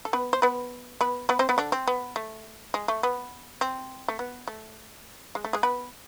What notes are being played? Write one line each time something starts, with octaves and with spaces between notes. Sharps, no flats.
A4
B3 B4
C5
B3 B4
B3 B4
B3 B4
C4 C5
B3 B4
D3 D4
C4
B3
A3
G#3
A3
B3
C4
A3
B3
A3
G#3
A3
G#3 G#4
B3 B4